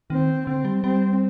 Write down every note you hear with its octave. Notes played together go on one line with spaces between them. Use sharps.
D#3 C4
D3 C4
G3
G3 C4